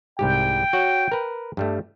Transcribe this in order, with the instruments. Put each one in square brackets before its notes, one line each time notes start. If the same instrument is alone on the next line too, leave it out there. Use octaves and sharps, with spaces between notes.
[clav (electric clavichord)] C2 G#2 G4 [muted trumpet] G5
[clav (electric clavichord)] F#4 C#5 F#5
A#4 B4
G2 G3 A3